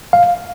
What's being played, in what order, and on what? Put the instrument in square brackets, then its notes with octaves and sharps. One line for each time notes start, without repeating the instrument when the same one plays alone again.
[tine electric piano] F5